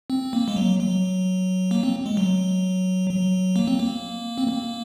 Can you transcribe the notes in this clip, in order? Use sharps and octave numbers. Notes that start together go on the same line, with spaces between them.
C4
A#3
G#3
F#3
F#3
A#3
C4
G#3
F#3
F#3
A#3
C4
A#3
C4
A#3